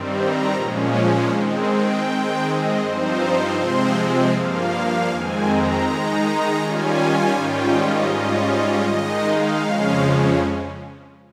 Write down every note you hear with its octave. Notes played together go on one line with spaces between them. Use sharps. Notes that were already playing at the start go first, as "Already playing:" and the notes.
Already playing: G2 D#3 G3 C4
A#5
A#2 F3 G#3 C#4
D#3 G#3 C4
G5
D#3 G#3 C4
D#5
G2 F3 C4 D#4 C5
C3 F3 G#3 C4 C5
G2 F3 A#3 F5
F2 D#3 G#3 C4 G#5
A#5
D#3 G#3 D#4
D#3 G3 C#4 F4 G#5
G#2 D#3 G3 C#4 F4 G5
D#5
G#2 G3 C#4 F4
D#3 G#3 D#4 D#5
F5
F2 C#3 F3 G#3 C#4